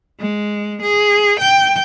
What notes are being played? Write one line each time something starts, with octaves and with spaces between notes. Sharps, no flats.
G#3
G#4
G5